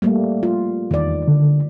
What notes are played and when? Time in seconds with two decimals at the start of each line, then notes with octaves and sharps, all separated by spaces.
0.02 G3 A3 A#3
0.43 F4
0.91 E2 D#3 D5
1.28 D3